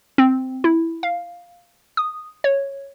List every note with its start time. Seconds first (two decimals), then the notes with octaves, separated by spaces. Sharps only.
0.18 C4
0.64 E4
1.03 F5
1.97 D#6
2.44 C#5